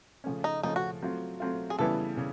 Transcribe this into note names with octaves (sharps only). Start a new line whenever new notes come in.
C#3 F3 A3 C#4
D#4
C#3 F3 A3 C#4 D#4
F#4
F#3 A3 C4 F4
F#3 A3 C4 F4
G#4
C#3 E3 G3 B3 E4 A4
C#3